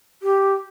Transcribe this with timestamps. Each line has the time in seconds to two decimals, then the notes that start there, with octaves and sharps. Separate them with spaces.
0.22 G4